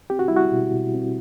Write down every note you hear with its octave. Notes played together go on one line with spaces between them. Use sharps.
C4 G4
F#4
G3 E4
F#4
B2
B2
C4